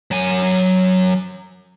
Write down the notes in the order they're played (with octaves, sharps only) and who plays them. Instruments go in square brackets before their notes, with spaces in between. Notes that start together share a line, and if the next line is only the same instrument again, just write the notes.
[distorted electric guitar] F#3 G#5